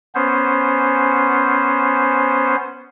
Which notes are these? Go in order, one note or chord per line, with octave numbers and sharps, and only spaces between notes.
B3 C#4 C5